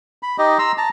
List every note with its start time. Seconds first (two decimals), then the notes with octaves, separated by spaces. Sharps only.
0.23 B5
0.38 D#4 G4 D#5
0.59 A#5 C6 E6
0.78 A5 A#5